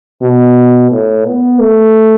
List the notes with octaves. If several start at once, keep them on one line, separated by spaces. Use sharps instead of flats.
B2
A2
B3
A3